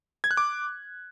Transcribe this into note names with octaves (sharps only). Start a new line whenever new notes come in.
G#6
F#6
D6